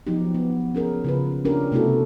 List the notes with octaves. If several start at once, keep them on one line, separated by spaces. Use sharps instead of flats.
F3 F#3 B3 D#4 G4
B3
C#4 G#4 A#4
C#3 F4 B4
C#4 D4 F4 G4 A#4
C3 A3 B3 E4 F#4 A4